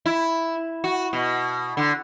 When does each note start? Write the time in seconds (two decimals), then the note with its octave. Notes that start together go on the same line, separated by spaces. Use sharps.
0.06 E4
0.84 F#4
1.13 B2
1.77 D3